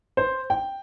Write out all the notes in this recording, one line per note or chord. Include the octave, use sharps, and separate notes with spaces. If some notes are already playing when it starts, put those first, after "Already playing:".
C5
G5